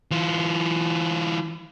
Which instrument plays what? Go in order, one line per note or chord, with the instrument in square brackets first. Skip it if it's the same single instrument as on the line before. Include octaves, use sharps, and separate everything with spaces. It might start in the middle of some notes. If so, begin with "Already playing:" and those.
[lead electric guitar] E3 F4